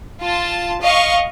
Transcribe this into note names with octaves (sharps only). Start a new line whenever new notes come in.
F4 A5
D#5 F5 C#6